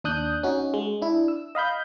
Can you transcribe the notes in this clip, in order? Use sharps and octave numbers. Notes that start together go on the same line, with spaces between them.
D#2 D4 D#6 F#6 G6
C#4 D#4 F#4
G#3
D4 E4
E6
D#5 F5 B5 G6